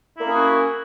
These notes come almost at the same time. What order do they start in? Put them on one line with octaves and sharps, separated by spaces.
E4 A#3 C#4 G#4 F#4